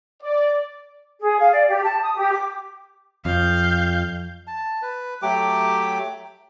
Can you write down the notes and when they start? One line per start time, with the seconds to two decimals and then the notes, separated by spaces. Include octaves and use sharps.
0.23 D5
1.20 G#4
1.40 F5
1.53 D5
1.68 G4
1.83 A5
2.03 D#6
2.16 G4
2.32 D6
3.25 F2 F5 G6
4.47 A5
4.82 B4
5.22 F#3 A3 G4 D6